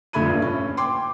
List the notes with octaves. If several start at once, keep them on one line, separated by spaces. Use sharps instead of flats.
F2 D3 A3 B5 G#6 D#7
A#1 G2
C#4
G5 C6 D6